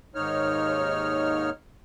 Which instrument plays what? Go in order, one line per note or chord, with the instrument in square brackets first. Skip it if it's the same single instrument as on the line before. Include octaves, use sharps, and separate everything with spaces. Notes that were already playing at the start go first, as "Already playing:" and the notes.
[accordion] D#2 G#2 D#4 C#5 F6